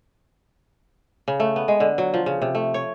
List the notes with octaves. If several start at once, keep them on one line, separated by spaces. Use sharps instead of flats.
C#3
A3
B3
G#3
D3
F#3
F3
C#3
C3
A3
C#5